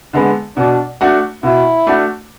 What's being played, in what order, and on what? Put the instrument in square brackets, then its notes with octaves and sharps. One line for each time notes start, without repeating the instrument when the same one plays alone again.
[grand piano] D3 G#3 B3
[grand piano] B2 [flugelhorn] D4
[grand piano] A3 D4 F#4
[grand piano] B2 [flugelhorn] E4
[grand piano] A3 D4 F#4